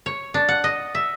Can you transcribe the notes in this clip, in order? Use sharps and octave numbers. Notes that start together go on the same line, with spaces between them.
C#5
D4
F#5
D#5
E5